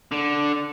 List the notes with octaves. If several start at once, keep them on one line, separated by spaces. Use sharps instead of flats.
D3